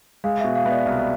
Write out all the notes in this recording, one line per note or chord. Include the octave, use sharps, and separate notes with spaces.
G#3 F5
B2 E5
F5
B3 D5 E5
C2 E5